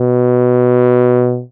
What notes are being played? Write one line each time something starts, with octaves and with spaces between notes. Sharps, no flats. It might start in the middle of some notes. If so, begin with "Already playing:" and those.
Already playing: B2